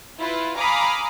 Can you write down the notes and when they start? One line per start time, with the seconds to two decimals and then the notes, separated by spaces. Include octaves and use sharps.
0.18 E4 F4 B4
0.58 F5 G#5 A#5 B5 D6 D#6